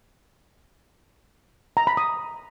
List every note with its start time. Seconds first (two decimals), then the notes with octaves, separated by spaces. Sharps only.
1.77 A#5
1.87 B5
1.97 D#6